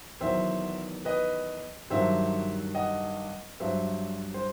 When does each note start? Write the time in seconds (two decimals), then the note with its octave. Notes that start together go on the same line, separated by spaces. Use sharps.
0.21 E2 D#3 F#3 C5 E5
1.05 B4 D#5
1.90 G2 D#3 F#3 C5 E5
2.75 D#5 F#5
3.60 G2 F#3 C5 E5
4.34 C5